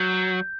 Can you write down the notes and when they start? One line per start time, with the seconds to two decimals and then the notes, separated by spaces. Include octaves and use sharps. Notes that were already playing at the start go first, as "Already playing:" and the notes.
Already playing: F#3 G6